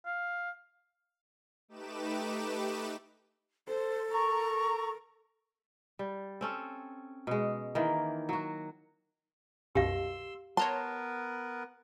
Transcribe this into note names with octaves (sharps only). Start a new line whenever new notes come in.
F5
A3 D#4 G4 B4 D6 E7
A4 C5
A#4 A#5 C#6
G3
C4 C#4 A4
B2 G#3
D#3 E3 A#3
F#3 F#4
C2 F#2 B2 G4 F5 C6 E6
B3 A#4 B4 C#5 A5 A#5 C6